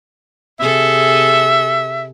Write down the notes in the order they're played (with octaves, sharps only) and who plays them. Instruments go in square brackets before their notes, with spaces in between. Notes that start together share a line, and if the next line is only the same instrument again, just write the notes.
[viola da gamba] C3 G#4 A4 [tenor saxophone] E5